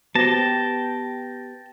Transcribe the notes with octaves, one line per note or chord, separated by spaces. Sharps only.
B3 F#4 G4 C5 G5 A5 A#6